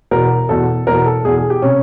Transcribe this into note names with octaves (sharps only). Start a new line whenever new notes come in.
E2 B2 A#4
E2 B2 A4
E2 B2 A#4
A4
E2 B2 G#4
G#4
G4
C3 C#4